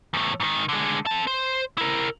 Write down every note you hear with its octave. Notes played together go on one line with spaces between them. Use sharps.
E2 A2
G#2 D#3
D3 G#3
C4 A5
C5
E4 A#4